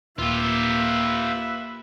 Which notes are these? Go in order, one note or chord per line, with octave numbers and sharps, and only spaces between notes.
D#1 A#3 F4 G4 B4 E5 E6